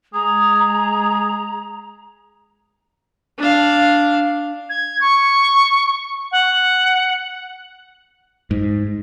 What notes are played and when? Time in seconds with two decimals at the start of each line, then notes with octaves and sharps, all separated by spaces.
0.14 G#3 G#4 A#5
3.38 D4 F5
4.70 G#6
5.01 C#6
6.32 F#5
8.51 G#2